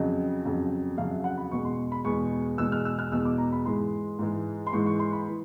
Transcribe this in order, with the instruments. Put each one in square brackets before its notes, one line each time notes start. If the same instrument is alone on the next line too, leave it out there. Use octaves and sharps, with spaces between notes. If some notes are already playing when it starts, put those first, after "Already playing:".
Already playing: [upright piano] F2 C#3 F#3 D#5
F2 C#3 F#3
F2 C#3 F#3 F5
E5
F#5
B5
E2 B2 G#3 C#6
C6
B5
E2 B2 G#3 C#6
E2 B2 G#3 E6
F6
E6
F6
E2 B2 G#3 E6
D6
A#5
B5
G#2 E3 G#3 C6
G#2 E3 G#3
C6
G#2 E3 G#3 C#6
C#6
C6
B5
E3